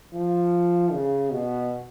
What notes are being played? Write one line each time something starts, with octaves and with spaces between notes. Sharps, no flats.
F3
C#3
B2